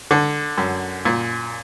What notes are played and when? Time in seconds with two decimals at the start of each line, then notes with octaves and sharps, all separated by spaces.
0.11 D3
0.58 F#2
1.05 A#2